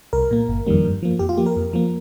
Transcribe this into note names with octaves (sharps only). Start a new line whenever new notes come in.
C2 A#4
A#2 A#3
G1
F2 D#3 G3 A#3
G2
F3 A#3
F2 G4
F4
F3 A#3 G4
A#4
F2
F3 A#3